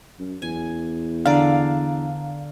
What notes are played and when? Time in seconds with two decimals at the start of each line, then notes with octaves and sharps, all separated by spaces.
0.19 F#2
0.42 E2 G#5
1.26 D3 D4 D5 F5 A#5